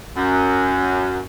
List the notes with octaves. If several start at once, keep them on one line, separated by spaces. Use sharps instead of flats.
F#2